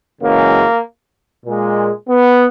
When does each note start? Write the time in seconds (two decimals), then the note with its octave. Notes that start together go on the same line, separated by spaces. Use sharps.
0.21 F#2 C#3 E3 G#3 A#3
1.46 A#2 G#3
2.09 B3